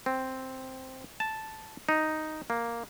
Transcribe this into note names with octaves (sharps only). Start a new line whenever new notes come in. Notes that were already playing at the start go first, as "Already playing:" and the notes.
C4
A5
D#4
A#3